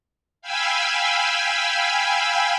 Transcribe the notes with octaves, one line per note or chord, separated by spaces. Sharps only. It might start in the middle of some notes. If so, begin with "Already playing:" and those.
F5 G5 G#5 B5 E6